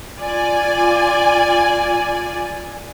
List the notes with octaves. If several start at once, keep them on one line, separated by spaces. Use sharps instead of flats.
F4 D5 G#5